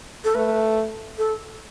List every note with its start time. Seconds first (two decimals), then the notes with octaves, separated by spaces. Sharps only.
0.24 A4
0.35 A3 B4
1.18 A4